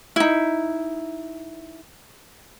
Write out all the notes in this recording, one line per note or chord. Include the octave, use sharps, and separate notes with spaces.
D#4 E4